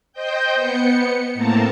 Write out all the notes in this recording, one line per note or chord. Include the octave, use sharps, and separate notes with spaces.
C5 D#5 G5 G6
B3 C#7
A2 A#3 C4 A#4 A5